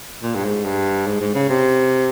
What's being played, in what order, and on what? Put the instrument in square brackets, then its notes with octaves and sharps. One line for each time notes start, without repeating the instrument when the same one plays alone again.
[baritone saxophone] A#2
G2
G#2
G2
G#2
G#2
C#3
C3